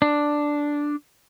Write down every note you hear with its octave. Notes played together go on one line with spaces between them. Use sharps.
D4